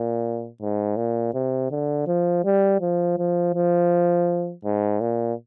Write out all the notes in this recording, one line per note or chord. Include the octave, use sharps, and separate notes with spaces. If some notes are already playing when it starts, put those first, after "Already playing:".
Already playing: A#2
G#2
A#2
C3
D3
F3
G3
F3
F3
F3
G#2
A#2